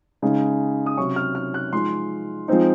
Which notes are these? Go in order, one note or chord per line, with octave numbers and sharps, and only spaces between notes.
C#3 G#3 D#4
D#6
C3 F#3 C#4 C#6
F6
F6
F#6
F3 G#3 D#4 C6
F3 G#3 C4 D#4